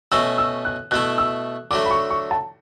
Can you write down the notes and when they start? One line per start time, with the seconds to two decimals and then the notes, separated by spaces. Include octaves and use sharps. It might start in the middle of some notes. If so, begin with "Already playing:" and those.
0.12 B2 A3 C#4 F#4 E6
0.38 E6
0.65 F#6
0.91 B2 A3 E4 F#6
1.18 E6
1.71 D3 F#3 A3 D6
1.86 B5
1.91 C#6
2.10 C#6
2.31 A5